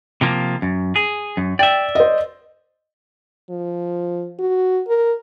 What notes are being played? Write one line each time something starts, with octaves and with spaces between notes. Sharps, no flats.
C3 F3 A#3
F#2
G#4
F#2
D5 E5 G5
C5 D#5
F3
F#4
A#4